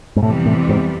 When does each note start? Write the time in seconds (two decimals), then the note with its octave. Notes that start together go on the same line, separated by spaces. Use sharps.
0.16 G#2
0.23 F2 A2 C3 E3 G3 B3
0.46 A2
0.69 G#2